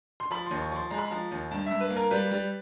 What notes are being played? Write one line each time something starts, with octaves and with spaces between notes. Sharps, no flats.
C6
F3 B5
D#2 C6
C#6
F3 C6
G#3 A#5
B5
A#5
F3
D#2
G2 A5
G2 E5
B4
A#3
A#4
G3 B4
G3